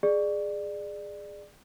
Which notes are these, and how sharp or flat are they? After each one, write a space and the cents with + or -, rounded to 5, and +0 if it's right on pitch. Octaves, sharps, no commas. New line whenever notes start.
G#4 +0 D5 +20